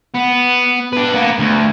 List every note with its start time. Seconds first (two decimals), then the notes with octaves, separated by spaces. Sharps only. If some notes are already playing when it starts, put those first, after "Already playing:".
0.14 B3
0.93 D4 B4
1.14 A#3 B3
1.39 D2